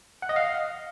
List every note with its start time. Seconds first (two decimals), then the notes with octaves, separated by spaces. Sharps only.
0.22 F#5
0.29 D#5
0.36 F5